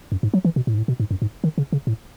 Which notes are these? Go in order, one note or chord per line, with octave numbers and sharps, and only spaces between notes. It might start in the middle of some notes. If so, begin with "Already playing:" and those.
F#2
G#2
F#3
E3
B2
A2
G#2
A2
B2
G#2
F#2
G#2
D#3
C#3
C#3
A2